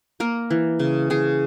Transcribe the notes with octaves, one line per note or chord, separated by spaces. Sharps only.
A#3 A#4
E3
C#3
C#3 G#4